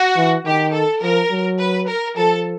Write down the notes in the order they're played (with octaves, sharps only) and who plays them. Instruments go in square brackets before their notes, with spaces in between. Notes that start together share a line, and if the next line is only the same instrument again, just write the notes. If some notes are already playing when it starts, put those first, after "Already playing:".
Already playing: [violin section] F#4
[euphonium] E3
[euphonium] D#3 [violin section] G4
[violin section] A4
[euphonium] F3 [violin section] A#4
[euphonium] F#3
[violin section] B4
A#4
[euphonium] F3 [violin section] A4